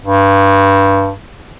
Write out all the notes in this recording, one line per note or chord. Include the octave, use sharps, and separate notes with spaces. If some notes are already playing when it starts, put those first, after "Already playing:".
G2